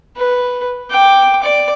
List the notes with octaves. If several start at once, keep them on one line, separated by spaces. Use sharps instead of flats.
B4
G5 D6
D5 D6